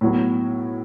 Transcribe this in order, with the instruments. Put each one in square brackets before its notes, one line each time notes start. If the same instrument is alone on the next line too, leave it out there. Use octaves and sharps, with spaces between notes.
[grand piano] A2 F#3 B3